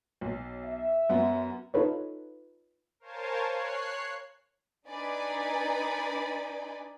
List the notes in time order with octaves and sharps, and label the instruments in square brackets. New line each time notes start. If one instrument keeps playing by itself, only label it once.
[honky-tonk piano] B1
[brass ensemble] E5
[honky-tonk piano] F#2 B3
[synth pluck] D#4 F4 A4 B4 C#5
[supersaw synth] A#4 C5 C#5 F5 G#5 A5
C#5 F#6 C7
[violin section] D4 D#4 B4 D5 G#5 B5